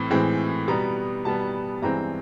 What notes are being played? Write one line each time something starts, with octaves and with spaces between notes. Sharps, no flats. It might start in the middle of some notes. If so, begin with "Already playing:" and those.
Already playing: A2 E3 C4
A2 E3 G#3 C4
B2 G3 B3 A#5
B2 G3 B3 A5
G2 E3 G#3 C4 A#5